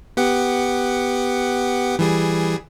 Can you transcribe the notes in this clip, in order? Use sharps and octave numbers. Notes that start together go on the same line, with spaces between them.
B3 G4 F#5
E3 G3 G#4